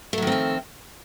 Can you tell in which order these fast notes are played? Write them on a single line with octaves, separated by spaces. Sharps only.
A3 F#3 D#3 C4 F3